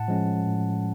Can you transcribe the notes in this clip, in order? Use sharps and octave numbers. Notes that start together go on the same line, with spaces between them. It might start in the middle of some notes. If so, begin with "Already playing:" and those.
Already playing: A2 F#5 A5
F3 G#3 C#4
A2